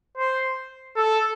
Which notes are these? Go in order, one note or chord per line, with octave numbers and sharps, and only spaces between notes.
C5
A4